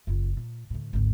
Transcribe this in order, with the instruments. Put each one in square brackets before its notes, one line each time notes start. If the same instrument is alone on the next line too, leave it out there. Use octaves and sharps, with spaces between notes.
[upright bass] F#1 F4
A#2
D2 A2
G#1 D2